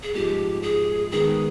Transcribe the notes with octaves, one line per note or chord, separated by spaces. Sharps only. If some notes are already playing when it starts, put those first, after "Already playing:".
G#4
G#2 F3 G#3 G4
G#4
D#3 G#3 B3 G#4